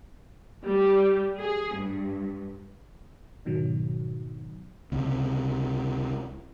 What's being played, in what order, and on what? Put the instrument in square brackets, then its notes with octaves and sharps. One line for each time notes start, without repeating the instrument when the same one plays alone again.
[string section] G3
G#4
G2
[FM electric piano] G#2 B2 D#3 F#3
[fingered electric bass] C#2 C3